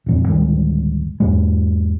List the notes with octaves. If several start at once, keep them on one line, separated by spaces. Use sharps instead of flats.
D#1 F2 G#2
D1 G2 D#3 G#3
E2 G#2 G#3